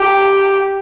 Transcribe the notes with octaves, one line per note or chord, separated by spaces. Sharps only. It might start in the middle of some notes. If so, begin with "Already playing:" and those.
Already playing: G4